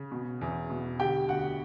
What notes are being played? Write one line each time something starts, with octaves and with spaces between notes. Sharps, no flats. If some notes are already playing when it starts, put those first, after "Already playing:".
Already playing: C#3
B2
E2
B2
D3 G4 G5
D2 F#4 F#5